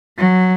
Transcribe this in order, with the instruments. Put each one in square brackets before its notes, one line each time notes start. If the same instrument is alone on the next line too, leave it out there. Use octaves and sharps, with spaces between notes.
[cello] F#3